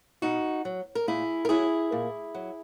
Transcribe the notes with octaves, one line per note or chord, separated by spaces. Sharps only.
B2 D#4 F#4
F#3
A#4
A#2 E4 G#4
A#4
F#3 E4 G#4
A#2
F#3